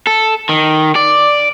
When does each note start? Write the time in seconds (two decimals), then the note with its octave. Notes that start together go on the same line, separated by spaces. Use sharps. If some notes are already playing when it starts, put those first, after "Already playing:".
0.07 A4
0.49 D#3
0.96 D5